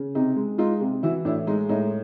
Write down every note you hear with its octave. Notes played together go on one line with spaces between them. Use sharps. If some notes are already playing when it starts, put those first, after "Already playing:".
Already playing: C#3
C3 D#4
G#3
G#3 D#4 F4
C3
E3 E4 F#4
A2 D4 E4
G#3 D#4
A2 D#4